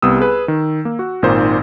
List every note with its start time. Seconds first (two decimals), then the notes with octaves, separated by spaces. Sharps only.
0.02 C2 G3 B3 D#6 E6
0.21 G#4 B4
0.48 D#3
0.85 A#3
0.99 F#4
1.22 G#1 A#2 D#3 C5